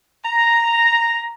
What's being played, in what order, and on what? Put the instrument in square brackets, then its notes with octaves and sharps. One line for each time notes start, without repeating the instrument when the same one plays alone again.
[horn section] A#5